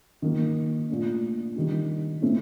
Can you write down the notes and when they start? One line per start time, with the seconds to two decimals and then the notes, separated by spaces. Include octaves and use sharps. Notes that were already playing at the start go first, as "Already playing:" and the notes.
0.22 D#3 F#3 A#3
0.89 A#2 A3 D4
1.55 D#3 G3 D4
2.22 A2 A3 C4